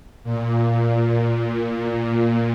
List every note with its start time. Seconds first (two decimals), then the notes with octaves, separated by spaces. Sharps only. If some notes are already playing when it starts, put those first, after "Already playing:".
0.24 A#2